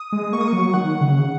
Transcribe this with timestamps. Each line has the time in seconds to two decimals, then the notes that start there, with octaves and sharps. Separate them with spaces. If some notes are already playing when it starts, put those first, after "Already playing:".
Already playing: D#6
0.12 G#3
0.33 A#3 C#6
0.41 D#6
0.48 C#6
0.53 F#3
0.74 D#3 F#5
1.01 C#3